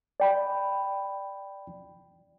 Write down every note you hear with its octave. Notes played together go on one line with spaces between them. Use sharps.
D5 G5 B5